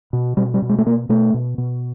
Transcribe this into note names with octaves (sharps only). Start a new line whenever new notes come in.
B2
B2 G3
G3
B2
G#3
A3
B2 A#3
B2 A3
B2
B2